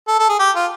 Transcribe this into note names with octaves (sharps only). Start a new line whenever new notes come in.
A4
A4
G#4
G4
F4